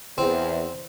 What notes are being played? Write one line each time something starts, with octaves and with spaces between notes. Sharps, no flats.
E2 C4